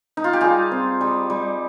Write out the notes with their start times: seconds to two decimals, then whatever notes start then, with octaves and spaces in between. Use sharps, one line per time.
0.17 D#4
0.24 F4
0.33 G4
0.41 G3 F4 G#4
0.71 C4
1.01 G3
1.30 G3